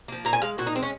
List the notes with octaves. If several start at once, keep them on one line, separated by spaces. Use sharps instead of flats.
F3 A#3
A#2 A#5
G#5
G#3 F5
A#2 F#4
D#4
G#3 C4
C#4